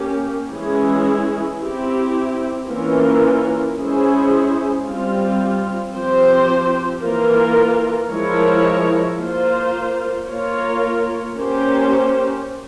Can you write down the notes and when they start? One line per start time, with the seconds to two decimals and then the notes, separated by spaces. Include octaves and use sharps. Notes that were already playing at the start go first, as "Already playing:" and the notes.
Already playing: A#3 C#4 G4
0.51 E3 G#3 C#4 E4 G#4
1.60 C4 E4 G4
2.68 E3 A#3 C#4 F4 A#4
3.77 G#3 C#4 E4 G#4 C5
4.85 G3 C4 F4
5.93 F3 C4 G4 C5
7.02 E3 A#3 F4 A#4
8.11 F3 G#3 E4 A#4 C#5
9.19 A#3 F4 C5
10.28 A#3 F4 A#4 C#5
11.35 A#3 C#4 G4 C5